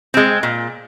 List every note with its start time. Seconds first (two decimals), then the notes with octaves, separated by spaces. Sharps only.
0.14 G#3 C4
0.43 A#2